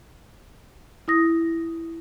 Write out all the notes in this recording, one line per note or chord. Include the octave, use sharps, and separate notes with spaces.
E4 D#6 A#6